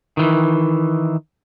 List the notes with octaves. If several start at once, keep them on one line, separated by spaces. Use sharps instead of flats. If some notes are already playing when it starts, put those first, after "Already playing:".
D#3 E3